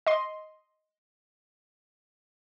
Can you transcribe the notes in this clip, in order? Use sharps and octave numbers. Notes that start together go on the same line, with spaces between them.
D#5 C6